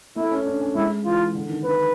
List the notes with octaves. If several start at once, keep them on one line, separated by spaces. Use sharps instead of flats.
A3 E4
C#4
D4
C#4
G#3 E4
E3 F4
D3
D#3
D#3 B4